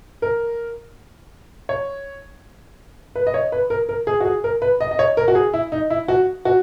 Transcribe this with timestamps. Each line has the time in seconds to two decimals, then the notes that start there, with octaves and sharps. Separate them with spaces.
0.22 A#4
1.69 C#5
3.16 B4
3.27 D#5
3.34 C#5
3.52 B4
3.70 A#4
3.89 A#4
4.07 G#4
4.20 F#4
4.25 G#4
4.44 A#4
4.62 B4
4.80 D#5
4.91 D#5
4.99 C#5
5.17 A#4
5.28 F#4
5.35 G#4
5.53 E4
5.72 D#4
5.90 E4
6.08 F#4
6.45 F#4